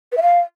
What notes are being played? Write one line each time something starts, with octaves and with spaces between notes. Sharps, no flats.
B4
E5
F5